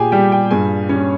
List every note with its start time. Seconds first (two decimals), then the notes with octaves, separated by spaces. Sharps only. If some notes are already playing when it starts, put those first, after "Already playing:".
Already playing: A#2 G4 G#4 G5 G#5
0.12 G3 G4 G5
0.32 G4 G5
0.51 G2 G#4 G#5
0.89 G3 C#4 C#5